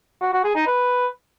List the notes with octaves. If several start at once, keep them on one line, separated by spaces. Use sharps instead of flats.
F#4
F#4
G#4
D#4
B4